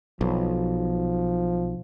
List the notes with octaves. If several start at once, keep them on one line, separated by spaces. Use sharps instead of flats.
B1 F3